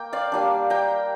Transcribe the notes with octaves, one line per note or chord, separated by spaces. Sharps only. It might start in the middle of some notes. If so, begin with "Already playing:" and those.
Already playing: A#3 G5
D5 F5
G3 A#3 D4
G5 A#5